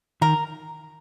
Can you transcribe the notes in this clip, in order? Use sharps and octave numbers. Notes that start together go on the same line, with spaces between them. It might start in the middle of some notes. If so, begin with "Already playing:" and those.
D#3 A#4